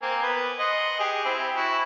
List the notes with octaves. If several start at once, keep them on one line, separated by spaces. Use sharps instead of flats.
A#3 C4 G#5
B3 B4
D#5 F#5 C6
G4 G#4
C4 E4
E4 F#4